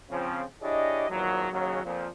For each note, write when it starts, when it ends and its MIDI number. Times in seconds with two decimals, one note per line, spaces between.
0.10 0.42 49
0.10 0.42 53
0.10 0.42 60
0.62 1.06 62
0.62 1.06 64
0.62 1.06 67
0.62 1.06 68
0.62 1.06 73
0.62 1.06 75
1.09 1.48 32
1.09 1.48 40
1.09 1.48 46
1.09 1.48 51
1.09 1.48 53
1.09 1.48 54
1.51 1.83 39
1.51 1.83 49
1.51 1.83 54
1.84 2.07 41
1.84 2.07 46
1.84 2.07 53